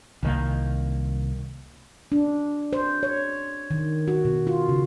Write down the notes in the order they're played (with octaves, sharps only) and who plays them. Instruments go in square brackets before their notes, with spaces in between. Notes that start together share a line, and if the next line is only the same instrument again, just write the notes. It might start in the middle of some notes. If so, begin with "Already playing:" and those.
[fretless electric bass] C2 D#3 A#3
[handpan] D4
C5
C#5
D#3
F#4
B2
F4
C#3